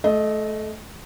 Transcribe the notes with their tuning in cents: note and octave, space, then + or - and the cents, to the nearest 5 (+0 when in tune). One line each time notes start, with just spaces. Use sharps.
A3 -25 D#5 +0